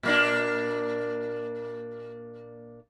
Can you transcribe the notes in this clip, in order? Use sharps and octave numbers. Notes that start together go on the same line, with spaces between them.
A#2 A#3 D4